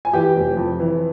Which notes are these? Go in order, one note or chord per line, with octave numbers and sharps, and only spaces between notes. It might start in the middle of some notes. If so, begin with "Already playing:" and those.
G#5
E3 G4 G5
F1
F2
E3